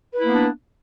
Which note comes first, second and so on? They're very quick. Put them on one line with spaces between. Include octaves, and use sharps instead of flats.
B4 E4 A#3 B3 D4